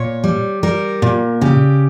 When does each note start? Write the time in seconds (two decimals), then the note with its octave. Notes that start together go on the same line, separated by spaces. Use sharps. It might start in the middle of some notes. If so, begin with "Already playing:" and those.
Already playing: A#2 C#5
0.24 G3
0.63 G3 A#4
1.02 A#2
1.41 C#3 G4